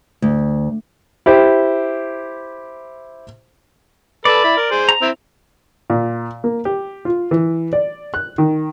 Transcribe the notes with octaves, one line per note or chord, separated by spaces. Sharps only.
D2
E4 G4 C5
A4 B4 D5
E4 B5
A#4
G#4 C5
A#5
C4 E4
A#2
A#3
G4
F4
E3
D5
F#6
D#3